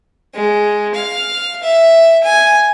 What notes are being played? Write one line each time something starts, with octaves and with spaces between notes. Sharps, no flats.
G#3
F5
E5
G#5